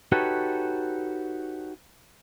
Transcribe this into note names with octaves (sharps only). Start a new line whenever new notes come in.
D#4 F#4 G4 A4 B4 C#5